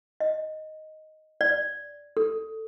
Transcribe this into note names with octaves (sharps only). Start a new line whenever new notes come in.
D#5
D5
A4